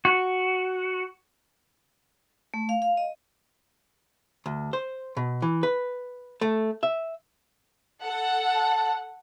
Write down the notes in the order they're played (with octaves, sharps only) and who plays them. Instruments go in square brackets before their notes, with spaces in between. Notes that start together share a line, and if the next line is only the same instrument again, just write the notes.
[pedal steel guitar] F#4
[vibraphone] A3
F5
F5
D#5
[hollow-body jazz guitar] D2
C5
B2
E3
B4
A3
E5
[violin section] A4 F#5
[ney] A5